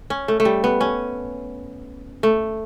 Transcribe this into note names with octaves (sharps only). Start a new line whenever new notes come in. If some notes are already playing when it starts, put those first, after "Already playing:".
C#4
A3
A3
G3
B3
C#4
A3